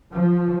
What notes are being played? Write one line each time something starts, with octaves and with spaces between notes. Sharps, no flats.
F3